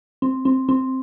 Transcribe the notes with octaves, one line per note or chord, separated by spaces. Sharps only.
C4
C4
C4